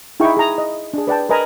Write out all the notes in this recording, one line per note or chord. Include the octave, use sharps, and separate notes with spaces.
D#4 E4 G#4 G5 C#6
G#4 A#5
D#5
D4 G#4
B4 D5 G5 A5
A#4 B4 D#5 G#5 A#5 B5